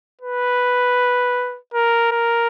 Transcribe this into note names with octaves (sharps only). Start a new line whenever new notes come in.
B4
A#4
A#4